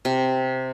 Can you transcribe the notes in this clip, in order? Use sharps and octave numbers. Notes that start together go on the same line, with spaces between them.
C3